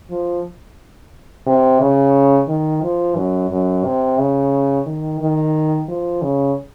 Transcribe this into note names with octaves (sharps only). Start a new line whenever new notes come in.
F3
C3
C#3
D#3
F3
F#2
F#2
C3
C#3
D#3
D#3
F3
C#3